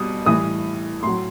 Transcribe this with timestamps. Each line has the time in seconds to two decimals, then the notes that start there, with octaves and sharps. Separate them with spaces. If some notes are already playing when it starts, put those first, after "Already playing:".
Already playing: B2 G3 D#6
0.26 A2 E3 G3 D#6
1.03 A2 F#3 C6